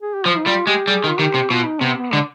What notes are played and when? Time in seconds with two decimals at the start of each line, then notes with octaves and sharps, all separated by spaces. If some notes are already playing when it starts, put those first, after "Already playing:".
0.02 G#4
0.14 G4
0.26 F3 F4
0.36 D#4
0.46 G3 F4
0.67 G#3 G4
0.88 G3 G#4
1.04 D#3
1.08 F4
1.19 D#3 G4
1.34 C3
1.51 B2 F4
1.65 D#4
1.81 C3 B3
1.97 B3
2.12 D3 G#3